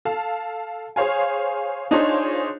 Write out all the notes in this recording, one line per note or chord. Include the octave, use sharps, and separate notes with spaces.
A4 F5 A5
G#4 C5 C#5 F5 G#5
D4 D#4 F4 G#4 C5 C#5